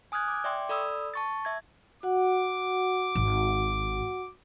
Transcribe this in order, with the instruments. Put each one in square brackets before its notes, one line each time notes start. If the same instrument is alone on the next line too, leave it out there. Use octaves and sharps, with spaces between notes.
[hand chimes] G#5 D#6 F6 F#6 G#6
D6
D5 E5 G5 C6 D6
A4 D5 B5 D#6 E6
A5 C#6 A6
E5 G#6
[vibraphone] F#4 F#5 [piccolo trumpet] D6
[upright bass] G#1